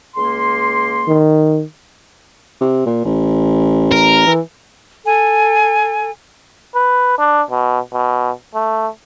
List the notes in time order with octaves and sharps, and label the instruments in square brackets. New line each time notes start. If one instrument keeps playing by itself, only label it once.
[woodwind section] C#2 A#3 C6
[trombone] D#3
[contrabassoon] C3
A#2
A1
[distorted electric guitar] A#4
[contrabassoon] E3
[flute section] A4 G#5
[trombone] B4
D4
B2
B2
A3